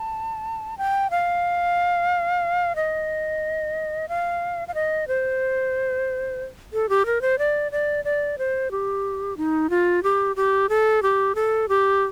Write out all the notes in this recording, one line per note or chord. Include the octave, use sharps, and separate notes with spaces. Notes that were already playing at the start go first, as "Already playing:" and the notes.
Already playing: A5
G5
F5
D#5
F5
F5
D#5
C5
A4
G4
A#4
C5
D5
D5
D5
C5
G4
D#4
F4
G4
G4
A4
G4
A4
G4